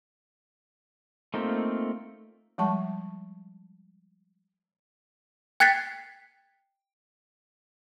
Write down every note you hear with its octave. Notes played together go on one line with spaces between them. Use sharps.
A3 A#3 C4 D#4 F4
F3 G3 G#3 A5 C#6
G5 F#6 G#6 A6 B6 C7